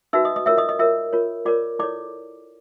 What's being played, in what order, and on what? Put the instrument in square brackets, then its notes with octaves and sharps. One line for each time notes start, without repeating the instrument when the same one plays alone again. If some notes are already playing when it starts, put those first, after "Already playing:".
[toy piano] D#4 F#4 B4 E5 E6
D#5 D#6
D#5 D#6
F4 A#4 C#5 E5 E6
D#5 D#6
D#5 D#6
F4 A#4 C#5 E5 E6
F4 A#4 C#5
F4 A#4 C#5 D5 D6
E4 A4 C#5 D5 D6